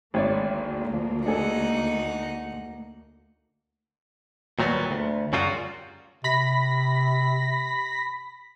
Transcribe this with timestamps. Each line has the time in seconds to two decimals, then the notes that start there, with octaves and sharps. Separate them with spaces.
0.14 G#1 D2 A#3 C#5 D5
0.93 F3
1.26 D4 D#4 G#4 A4 F#5
4.59 D#2 A#2 F#3 G3 B3
4.91 D2
5.33 F#2 C#3 F#3 G3 F4 F#4
6.24 C3 B5 A#6 B6